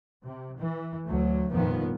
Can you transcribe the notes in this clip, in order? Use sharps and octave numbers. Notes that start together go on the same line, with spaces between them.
C3
E3
D2 F#3 A3
F1 G2 A#2 D#3 F3 B3